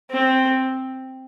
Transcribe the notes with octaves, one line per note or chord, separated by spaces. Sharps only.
C4